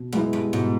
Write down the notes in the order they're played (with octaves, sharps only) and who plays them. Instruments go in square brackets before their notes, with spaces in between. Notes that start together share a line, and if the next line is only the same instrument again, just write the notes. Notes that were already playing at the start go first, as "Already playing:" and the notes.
Already playing: [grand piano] B2
[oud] F#2 [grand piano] G#3 B3 E4
[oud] G2
[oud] G#2 [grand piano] B2